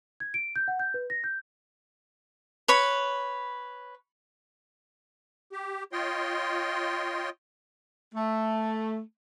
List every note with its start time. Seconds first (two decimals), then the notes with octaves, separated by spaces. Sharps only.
0.20 G#6
0.34 D7
0.56 G6
0.68 F#5
0.79 G6
0.94 B4
1.10 A#6
1.24 G6
2.68 B4 C#5 B5
5.52 G4
5.92 F4 C#5 D#5 G5 C6
8.14 A3